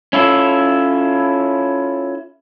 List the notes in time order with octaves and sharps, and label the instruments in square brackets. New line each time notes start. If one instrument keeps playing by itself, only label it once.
[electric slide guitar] C#4 E4 F4 A4